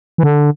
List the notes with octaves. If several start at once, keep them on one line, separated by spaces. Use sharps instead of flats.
E3
D3